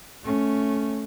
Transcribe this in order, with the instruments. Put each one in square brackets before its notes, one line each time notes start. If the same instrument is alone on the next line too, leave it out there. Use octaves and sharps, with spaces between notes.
[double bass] A3 C#4